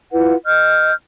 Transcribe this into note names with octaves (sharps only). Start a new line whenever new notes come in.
E4 F4 B4 F#5
D#5 F6 G6